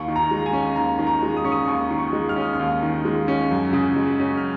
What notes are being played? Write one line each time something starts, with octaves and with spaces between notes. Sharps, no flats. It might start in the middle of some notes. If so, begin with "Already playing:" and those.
Already playing: D#2 C#6
D#3
A#5
G#3
G#5
C#4
D#2 A#5
D#3
A#5
G#3
D#6
C#4 C#6
D#6
D#2 C#6
D#3
C#6
G#3
F6
C#4 D#6
F6
D#2
D#3
G#3
C#4
F#2
C#3
G#3
C#4
F6